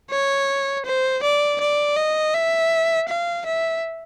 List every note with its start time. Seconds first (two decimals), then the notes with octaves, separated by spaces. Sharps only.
0.11 C#5
0.85 C5
1.23 D5
1.60 D5
1.97 D#5
2.34 E5
3.09 F5
3.46 E5